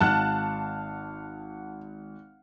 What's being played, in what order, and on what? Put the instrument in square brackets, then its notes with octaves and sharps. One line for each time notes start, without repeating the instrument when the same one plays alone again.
[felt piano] G#1 [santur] F5 F#5 [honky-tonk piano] A5 F#6